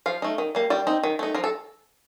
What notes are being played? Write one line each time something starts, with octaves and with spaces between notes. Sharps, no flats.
F3 F5
A3 D#4
D#3
G3 A#3
G3 D5
C4 D#4
D#3
A3 D#4
F3 A#4
A4